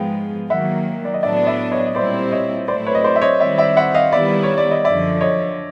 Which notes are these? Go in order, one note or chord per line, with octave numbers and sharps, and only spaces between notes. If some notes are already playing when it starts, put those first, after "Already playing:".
Already playing: G#2 F3 G#3 B3 F5 G5
D#3 F#3 A#3 E5 F#5
D5
D#5
A2 F#3 B3 D4 D5 E5
D5 E5
C#5 D#5
D#5
A#2 G3 C4 E4 C5 D5
C#5 D#5
A2 F#3 A3 C4 E4 C5 D5
B4 C#5
D#5
C5 D5
E5
C#5 D#5
D#3 G3 C4 E4 D5 E5
D5 E5
E5 F#5
D#5 F5
D#3 G3 B3 E4 D5 E5
C#5
D5
D#5
F#2 D3 F3 D5 E5
C#5 D#5